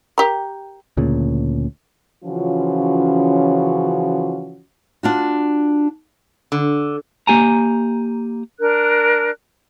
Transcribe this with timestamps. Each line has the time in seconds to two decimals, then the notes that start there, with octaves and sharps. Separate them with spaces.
0.18 G4 A#4
0.97 D2 A#2 C#3
2.24 C#3 E3 F3 C#4 F4 F#4
5.03 D4 F4 F#4
6.52 D3
7.27 A#3 G4 G#5 A#5
8.60 D4 A#4 F#6